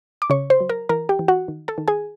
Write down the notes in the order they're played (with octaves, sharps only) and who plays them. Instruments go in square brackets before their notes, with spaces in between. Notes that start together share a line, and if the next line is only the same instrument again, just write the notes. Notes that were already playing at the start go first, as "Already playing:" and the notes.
[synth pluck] D6
C#3 C#5 C#6
C5 C6
F#3
A#4 A#5
E3 A#4 A#5
G4 G5
E3
F#4 F#5
D#3
A4 A5
D#3
G#4 G#5